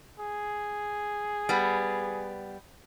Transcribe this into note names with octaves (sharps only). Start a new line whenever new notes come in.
G#4
G3 B3